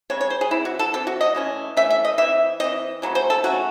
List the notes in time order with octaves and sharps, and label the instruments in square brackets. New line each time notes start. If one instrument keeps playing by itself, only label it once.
[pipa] C#3 G#3 C4 C#5
C#5
C5
G#4
E3 C4 E4
F#4
A4
E3 C4 A4
F#4
D#5
E3 A3 C#4
E3 A3 C#4 E5
E5
D#5
E3 C4 E5
E3 C4 D#5
C#3 F#3 A3 C#4
C5
A4
C#3 F#3 A3 C#4 F#4